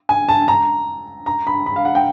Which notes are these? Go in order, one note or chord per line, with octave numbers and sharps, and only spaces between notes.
G#5
A5
A#5
A#5
B5
B5
F5
F#5
G5